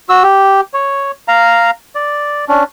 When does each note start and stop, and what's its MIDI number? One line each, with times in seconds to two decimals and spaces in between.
0.09 0.23 66
0.09 0.23 88
0.23 0.61 67
0.74 1.11 73
1.28 1.71 77
1.28 1.71 82
1.95 2.45 74
2.48 2.64 61
2.48 2.64 62